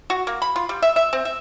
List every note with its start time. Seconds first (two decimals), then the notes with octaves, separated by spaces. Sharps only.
0.10 F#4
0.27 A#3
0.42 B5
0.56 F4
0.69 G3
0.82 E5
0.96 E5
1.13 C4
1.25 E5